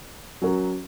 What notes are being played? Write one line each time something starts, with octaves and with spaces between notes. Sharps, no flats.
F#3 C#4 F#4 A#4